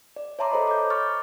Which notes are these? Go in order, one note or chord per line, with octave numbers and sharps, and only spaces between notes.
D5
C#5 E5 A5 A#5 C6 D6
A4 C5 D#5 B5
D6 G6
C#6 D6 F6 A6